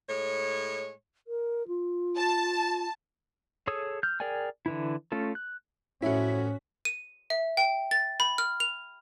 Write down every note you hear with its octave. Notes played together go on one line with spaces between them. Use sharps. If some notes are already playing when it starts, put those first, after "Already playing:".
A2 G#3 C#5
A#4
F4
A5
G#4 A4 C#5 D#6 E6
F6 G6
G#4 A#4 D5 G5 G#5
D3 E3 E4
A3 C#4 F4 A4
F#6
A1 F2 A2 C#4 E4 F#4 B6
D#7
E5
G5
A6
B5
F6
F7